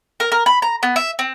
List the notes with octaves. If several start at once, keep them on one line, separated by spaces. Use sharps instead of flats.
A#4
A#4
B5
A#5
B3
E5
C4